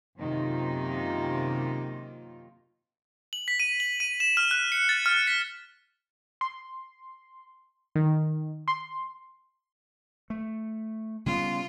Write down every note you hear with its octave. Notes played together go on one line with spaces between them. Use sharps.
F#2 C3 D#3 A#3 D#4 F4
F#7
B6
D#7
F#7
D#7
E7
F6
F#6
C#7
A6
F6
B6
C6
D#3
C6
A3
C#3 G3 B3 F4